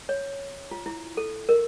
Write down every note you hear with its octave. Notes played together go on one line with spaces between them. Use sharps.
C#5
F4
E4
A4
A#4